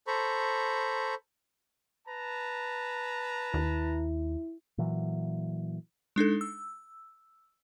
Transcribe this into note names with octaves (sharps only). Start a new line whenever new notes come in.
A4 C5 A#5 B5 C#6
B4 A5 A#5
D#2 E4
A#2 E3 F#3
G#3 D4 D#4 A4
E6